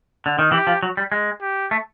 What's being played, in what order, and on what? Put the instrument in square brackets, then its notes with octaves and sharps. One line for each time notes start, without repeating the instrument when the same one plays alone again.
[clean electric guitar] D3
D#3
[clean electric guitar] E3 [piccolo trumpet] G4
[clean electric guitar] F3
F#3
G3
G#3
[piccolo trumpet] G4
[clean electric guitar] A3